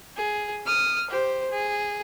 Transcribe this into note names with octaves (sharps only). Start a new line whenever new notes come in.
G#4
D#6 F6
G4 C5
G#4